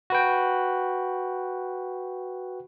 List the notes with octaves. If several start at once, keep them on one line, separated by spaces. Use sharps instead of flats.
F#4 B4 G5